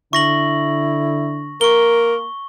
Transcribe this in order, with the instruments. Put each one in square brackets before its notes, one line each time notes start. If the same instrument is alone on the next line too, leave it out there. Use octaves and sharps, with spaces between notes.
[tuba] D3 [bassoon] E4 [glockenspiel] C#6 A#6 F#7
[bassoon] A#3 [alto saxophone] A#4 [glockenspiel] C#6 G7